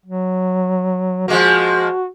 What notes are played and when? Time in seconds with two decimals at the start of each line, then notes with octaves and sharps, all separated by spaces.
0.06 F#3
1.28 F3 G#3 A#3 F#4